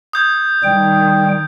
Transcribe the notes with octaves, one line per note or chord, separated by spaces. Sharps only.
D#6 G6 G#6
D#3 G3 G5